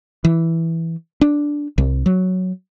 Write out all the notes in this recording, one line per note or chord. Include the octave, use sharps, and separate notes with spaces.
E3
D4
C2
F#3